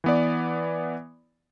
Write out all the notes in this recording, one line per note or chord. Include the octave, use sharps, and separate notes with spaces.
E3 B3 D5